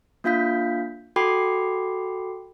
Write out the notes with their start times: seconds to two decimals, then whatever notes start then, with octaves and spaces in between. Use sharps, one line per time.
0.24 A#3 D4 F4 F5 G6 B6
1.16 F#4 A4 G5 B5 D6 C7